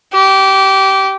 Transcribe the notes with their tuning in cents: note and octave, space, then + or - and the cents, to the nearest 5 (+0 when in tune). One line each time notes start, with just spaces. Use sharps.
G4 -20